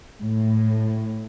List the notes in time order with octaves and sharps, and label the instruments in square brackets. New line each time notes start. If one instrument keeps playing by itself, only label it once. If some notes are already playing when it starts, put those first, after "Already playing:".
[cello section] A2